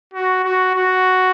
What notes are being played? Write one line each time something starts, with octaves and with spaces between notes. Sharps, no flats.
F#4
F#4
F#4